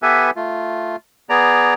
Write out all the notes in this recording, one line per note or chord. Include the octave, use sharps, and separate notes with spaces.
B3 G4 A4 B4 E5 G#5
A3 F4
B3 G#4 D5 A#5